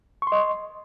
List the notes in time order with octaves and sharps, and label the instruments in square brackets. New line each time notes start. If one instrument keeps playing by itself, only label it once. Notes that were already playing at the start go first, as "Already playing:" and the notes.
[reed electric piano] C#6
C6
D#5